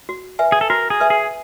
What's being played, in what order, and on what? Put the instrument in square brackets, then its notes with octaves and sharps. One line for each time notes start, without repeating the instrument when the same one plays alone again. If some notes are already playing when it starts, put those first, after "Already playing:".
[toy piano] F#4
B4 E5 G#5
[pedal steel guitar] G#4
A4
[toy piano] F#4 [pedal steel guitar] A#4
[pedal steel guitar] G#4
[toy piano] B4 E5 G#5
[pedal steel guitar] G#4